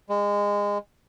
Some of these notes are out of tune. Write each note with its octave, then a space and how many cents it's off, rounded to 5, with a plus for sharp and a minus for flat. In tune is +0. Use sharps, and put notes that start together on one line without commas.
G#3 -25